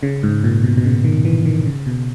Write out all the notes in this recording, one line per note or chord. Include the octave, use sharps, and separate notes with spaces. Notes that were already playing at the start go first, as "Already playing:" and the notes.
C#3
G#2
A#2
B2
B2
C#3
D#3
E3
D#3
C#3
B2